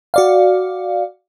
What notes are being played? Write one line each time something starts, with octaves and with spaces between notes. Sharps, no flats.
F#4 D5 F5